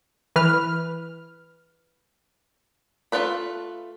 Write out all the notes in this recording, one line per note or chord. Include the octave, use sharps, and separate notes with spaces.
E3 B4 F6
A3 E4 F4 B4 B5